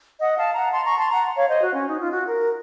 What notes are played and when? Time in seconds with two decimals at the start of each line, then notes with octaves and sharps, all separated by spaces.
0.20 D#5 F#5
0.37 F5 A5
0.55 F#5 A#5
0.72 A5 C6
0.84 A#5 C#6
0.98 A5 C6
1.10 F#5 A#5
1.36 C#5 F5
1.49 C5 D#5
1.61 F#4
1.75 C#4
1.88 D#4
2.00 F4
2.12 F#4
2.26 A#4